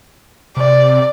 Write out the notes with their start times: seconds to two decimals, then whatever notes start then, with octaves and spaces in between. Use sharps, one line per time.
0.57 C3 D5